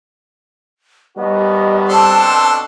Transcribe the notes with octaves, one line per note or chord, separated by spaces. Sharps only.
D#2 G3 B3 F#4 D#5
B2 C4 D4 A4 A5 C6